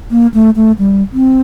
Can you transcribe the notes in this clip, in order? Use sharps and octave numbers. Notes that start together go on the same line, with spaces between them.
A#3
A3
A3
G3
C4